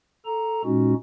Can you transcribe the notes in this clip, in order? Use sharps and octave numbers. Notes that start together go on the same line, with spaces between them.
A4 A#5
A#2 G#3 C#4 D#4 F#4